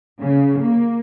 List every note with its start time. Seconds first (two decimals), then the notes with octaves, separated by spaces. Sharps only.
0.20 C#3
0.60 A#3